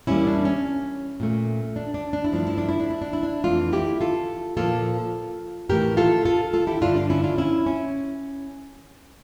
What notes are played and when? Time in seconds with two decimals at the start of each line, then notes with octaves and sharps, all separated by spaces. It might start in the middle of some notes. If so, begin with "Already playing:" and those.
0.07 E2 E3 G3 A#3 C#4 E4
0.27 D4
0.45 C#4
1.20 A#2 A3
1.76 D4
1.94 D4
2.13 D4
2.25 E4
2.32 G2 F3 A3 D4
2.47 E4
2.58 D4
2.69 E4
2.80 D4
2.90 E4
3.02 D4
3.13 E4
3.23 D4
3.44 F2 E3 A3 D4 F4
3.73 E4 G4
4.01 F4 A4
4.57 A#2 F3 A#3 F4 A4
5.69 A2 E3 A3 G4 A#4
5.97 F4 A4
6.25 F4 A4
6.54 F4 A4
6.67 E4 G4
6.81 G2 D3 G3 D4 F4
6.96 D4
7.10 C#4 E4
7.24 D4 F4
7.38 C#4 E4
7.66 C#4